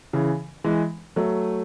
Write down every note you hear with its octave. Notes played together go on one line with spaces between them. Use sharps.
C#3 E3
E3 G#3
F#3 A3